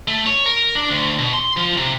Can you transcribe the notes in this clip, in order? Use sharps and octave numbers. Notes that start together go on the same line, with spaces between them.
A3
C#5
A#4
D4
D2
B2
C6
F3
C3